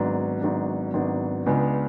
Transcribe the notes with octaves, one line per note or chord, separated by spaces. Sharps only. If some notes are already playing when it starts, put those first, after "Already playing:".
Already playing: G#1 G#2 F#3 B3 D4
G#1 G#2 F#3 B3 D4
G#1 G#2 F#3 B3 D4
C#2 C#3 G#3 B3 D4